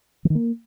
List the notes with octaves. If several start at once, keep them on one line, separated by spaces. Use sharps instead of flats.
E3
D#3
A#3